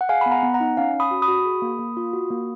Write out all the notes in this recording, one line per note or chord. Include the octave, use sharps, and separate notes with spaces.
F#5
G#4 F5 G#5
B3 B5
F#5 A#5
B3
F#5 A#5
D#4
C#4 F5 G#5
C#4
B5 D#6
F#4
B5 D#6
F#4
G#4
A#3
A#3
F4
F#4
A#3